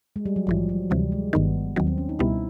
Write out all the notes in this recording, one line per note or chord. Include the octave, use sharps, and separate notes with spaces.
G#3
G3
F#3
A#1 G#2 E3 F3
F#3
D2 C3 E3 G3
G#3
G1 G2 D#3 B3
D#2 D#3 F#3 C4
C4
C#4
D#4
C#2 B2 G3 B3 E4